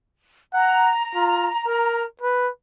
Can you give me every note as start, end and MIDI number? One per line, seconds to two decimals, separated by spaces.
0.54 0.92 78
0.54 2.03 82
1.15 1.49 65
1.67 2.05 70
2.21 2.49 71